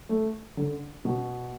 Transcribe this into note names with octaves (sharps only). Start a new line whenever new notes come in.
A3
D3
B2